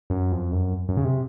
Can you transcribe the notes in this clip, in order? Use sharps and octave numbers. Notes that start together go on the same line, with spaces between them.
F#2
F2
F#2
F#2
C#3
C3